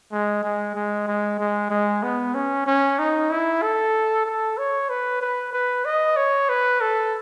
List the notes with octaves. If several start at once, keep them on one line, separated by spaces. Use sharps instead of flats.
G#3
G#3
G#3
G#3
G#3
G#3
B3
C#4
C#4
D#4
E4
A4
A4
C#5
B4
B4
B4
D#5
C#5
B4
A4